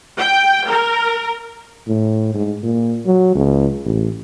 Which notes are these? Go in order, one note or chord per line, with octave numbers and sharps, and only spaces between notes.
G5
A#4
A2
G#2
A#2
F#3
C#2
A1